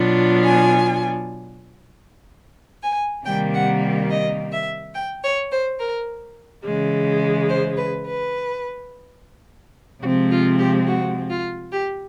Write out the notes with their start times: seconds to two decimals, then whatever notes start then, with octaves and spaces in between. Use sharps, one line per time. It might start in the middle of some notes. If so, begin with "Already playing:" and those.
Already playing: B2 F#3 B3 D4 F4
0.42 G#5
2.83 G#5
3.25 C3 D#3 G3 A#3 G5
3.54 F#5
4.10 D#5
4.52 E5
4.94 G5
5.23 C#5
5.51 C5
5.78 A#4
6.64 C#3 E3 G#3
7.49 C5
7.76 B4
8.05 B4
10.02 C3 F3 G#3 C4 F#4
10.31 F4
10.58 G4
10.87 F#4
11.29 F4
11.72 G4